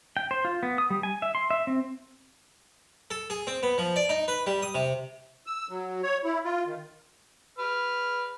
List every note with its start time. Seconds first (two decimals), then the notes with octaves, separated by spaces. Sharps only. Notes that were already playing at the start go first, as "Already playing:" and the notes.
0.17 G5
0.31 C5
0.45 F4
0.63 B3
0.78 D#6
0.90 G3
1.03 G#5
1.22 E5
1.35 C6
1.50 E5
1.67 C4
3.11 A4
3.30 G#4
3.47 C4
3.63 B3
3.78 F3
3.96 D5
4.09 D#4
4.28 B4
4.47 G3
4.63 D#6
4.75 C3
5.46 E6
5.69 F#3
6.03 C#5
6.24 E4
6.44 F4
6.66 D#3
7.58 B4 F6